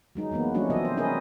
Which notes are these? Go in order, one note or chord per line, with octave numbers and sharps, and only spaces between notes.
F#3 G#3 D#4
E3 G#3 A#3 B3
F3 G3 A3 C#4 D4 F#4
C3 E3 F#3 C4 A4 D#5
C5
C#4 E4 G#4 A#4 B4 D#5